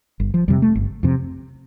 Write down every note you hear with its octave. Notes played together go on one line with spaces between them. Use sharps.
G1
F3
F2 C3 G3
A3
G1
F2 C3